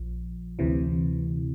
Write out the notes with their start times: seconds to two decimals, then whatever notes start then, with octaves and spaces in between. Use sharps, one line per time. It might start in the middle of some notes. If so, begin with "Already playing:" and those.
Already playing: A#1 F3
0.59 D2 C3 E3